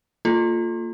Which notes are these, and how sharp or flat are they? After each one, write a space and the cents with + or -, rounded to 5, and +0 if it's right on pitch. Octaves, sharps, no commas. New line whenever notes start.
A#3 -25 F4 +0 A4 -15